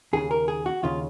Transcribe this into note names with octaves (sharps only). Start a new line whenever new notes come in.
D#2 C#3 G#4
A#4
G#4
F#4
D#2 C#3 F4